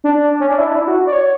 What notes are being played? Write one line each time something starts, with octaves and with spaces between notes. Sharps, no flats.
D4
C#4
D4
E4
D4
E4
F#4
D5
C#5